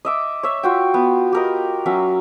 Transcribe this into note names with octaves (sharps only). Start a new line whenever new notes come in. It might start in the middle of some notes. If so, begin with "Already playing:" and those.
D#5 E5 D6
C#5 E5
F4 F#4 G5
B3
G4 A#4 D#5
F#3 C#4 E5